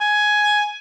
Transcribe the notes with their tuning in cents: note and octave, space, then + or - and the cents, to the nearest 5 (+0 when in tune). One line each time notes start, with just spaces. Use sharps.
G#5 +10